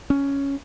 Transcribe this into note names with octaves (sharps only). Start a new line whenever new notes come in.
C#4